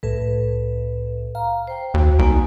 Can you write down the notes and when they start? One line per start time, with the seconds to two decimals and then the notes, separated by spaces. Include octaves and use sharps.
0.03 C2 A2 A4 B4
1.35 F5 A#5
1.67 C5 G5
1.94 D#2 F#4
2.19 C2 A#3 D#4 G#5